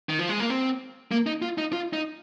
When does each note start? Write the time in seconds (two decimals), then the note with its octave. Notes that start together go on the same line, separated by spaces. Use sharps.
0.09 D#3
0.19 F3
0.29 G#3
0.40 A#3
0.50 C4
1.11 A#3
1.27 D#4
1.42 F4
1.58 D#4
1.73 F4
1.93 D#4